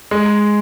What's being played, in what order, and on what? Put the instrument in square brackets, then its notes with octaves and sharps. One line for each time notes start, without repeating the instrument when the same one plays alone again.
[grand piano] G#3